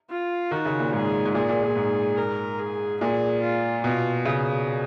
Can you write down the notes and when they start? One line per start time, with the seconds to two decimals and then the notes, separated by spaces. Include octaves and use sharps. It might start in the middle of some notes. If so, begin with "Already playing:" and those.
0.10 F4
0.51 D#3 F#4
0.65 C#3
0.80 A#2
0.93 G#2 G#4
1.25 G#2
1.34 A#2 G#4
1.49 A#2
1.63 A#2
1.76 G#2
2.17 A#4
2.59 G#4
3.01 A#2 G#4
3.42 F4
3.83 B2 F4
4.25 C#3